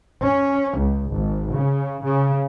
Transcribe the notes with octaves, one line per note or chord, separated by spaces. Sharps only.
C#4
C#2
G#1
C#3
C#3